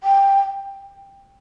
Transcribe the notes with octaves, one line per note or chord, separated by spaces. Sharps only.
G5